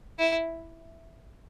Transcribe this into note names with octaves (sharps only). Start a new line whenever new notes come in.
E4